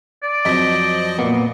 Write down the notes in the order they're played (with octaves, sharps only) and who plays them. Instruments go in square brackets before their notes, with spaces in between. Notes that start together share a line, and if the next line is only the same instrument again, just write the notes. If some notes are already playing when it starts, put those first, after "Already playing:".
[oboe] D5
[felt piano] F2 F#3 B6 [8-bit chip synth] F3 D#5
[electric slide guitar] A#2 A#3 B3